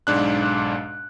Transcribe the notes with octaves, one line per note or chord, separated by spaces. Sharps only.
B1 G#2 D4 F#6